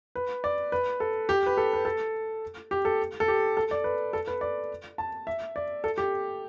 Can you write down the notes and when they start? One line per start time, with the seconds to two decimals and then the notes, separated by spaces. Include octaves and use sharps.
0.15 B4
0.44 D5
0.72 B4
1.00 A4
1.29 G4
1.46 B4
1.57 A4
1.73 B4
1.85 A4
2.71 G4
2.85 A4
3.20 A4
3.28 G4
3.57 A4
3.71 D5
3.84 B4
4.13 A4
4.27 B4
4.41 D5
4.98 A5
5.27 E5
5.56 D5
5.84 A4
5.98 G4